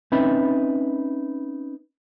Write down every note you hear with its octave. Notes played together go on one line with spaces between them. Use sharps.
C4 C#4 D#4 B4 E5 B5